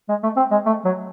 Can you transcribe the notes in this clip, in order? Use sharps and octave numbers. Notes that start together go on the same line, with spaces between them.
G#3
A3
C4
G#3
A3
F#3